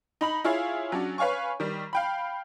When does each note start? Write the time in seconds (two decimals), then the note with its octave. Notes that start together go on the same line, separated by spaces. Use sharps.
0.21 D#4 B5 F#7
0.44 E4 F4 G#4 C#5 F5
0.92 F#3 C#4 D4
1.18 B4 C#5 F5 G#5 C#6
1.60 D#3 G3
1.93 F5 G5 B5